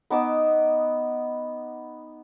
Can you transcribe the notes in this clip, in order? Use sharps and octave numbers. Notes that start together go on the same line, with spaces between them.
B3 D#4 D6 E6